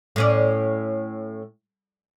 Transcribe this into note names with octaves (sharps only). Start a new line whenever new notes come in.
A2 C#4 D5